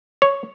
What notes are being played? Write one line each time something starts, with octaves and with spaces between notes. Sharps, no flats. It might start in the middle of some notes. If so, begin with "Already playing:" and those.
C#5